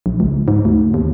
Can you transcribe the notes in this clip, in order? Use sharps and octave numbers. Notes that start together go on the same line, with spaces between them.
A#1
C#2
G#2
D2
D#2